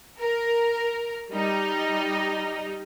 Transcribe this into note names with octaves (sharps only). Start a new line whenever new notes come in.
A#4
G3 D#4